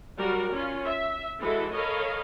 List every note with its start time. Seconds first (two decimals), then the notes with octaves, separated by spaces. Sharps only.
0.18 F#3 G3 F#4 A#4 D5
0.52 C#4 F4
0.87 E5
1.41 E3 G#3 E4 F#4 A4
1.75 A4 A#4 C#5 D#5 F5 B5